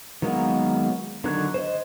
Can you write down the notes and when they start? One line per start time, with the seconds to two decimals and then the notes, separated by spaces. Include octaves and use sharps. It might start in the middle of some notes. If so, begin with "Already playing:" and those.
0.22 D#3 F#3 G#3 A#3 B3
1.24 D3 D#3 F#3 C#5 F#6
1.54 C5 D#5